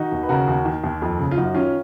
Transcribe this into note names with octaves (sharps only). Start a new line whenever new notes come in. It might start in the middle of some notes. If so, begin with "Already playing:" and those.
Already playing: D#3 D#4 F#4
D#2
B4
C#3 F#4 A#4
D#2
D#3
D#2
F2
C#3
F4
F#2 D#4 F#4
D#3 C#4 F4